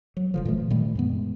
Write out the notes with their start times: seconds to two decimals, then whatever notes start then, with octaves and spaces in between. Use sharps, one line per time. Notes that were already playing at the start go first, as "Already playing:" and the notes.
0.17 F#3
0.34 F#1 D3 F3
0.45 A#2 E3 A3
0.70 A#2 D#3 G3 A3
0.95 F#2 G#3 B3